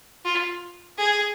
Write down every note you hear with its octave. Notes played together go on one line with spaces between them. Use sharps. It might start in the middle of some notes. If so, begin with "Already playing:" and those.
F4
G#4